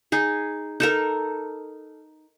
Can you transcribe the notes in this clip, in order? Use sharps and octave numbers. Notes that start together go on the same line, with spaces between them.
D#4 G#4
D#4 A4 A#4